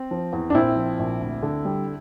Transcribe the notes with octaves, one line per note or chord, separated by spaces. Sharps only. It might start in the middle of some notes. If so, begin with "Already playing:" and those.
Already playing: C4
F3
E2
D4
A#1 C4 E4
F3
A#1
D2
D3
G3